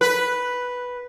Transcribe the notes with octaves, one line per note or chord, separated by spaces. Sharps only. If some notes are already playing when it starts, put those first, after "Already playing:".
B4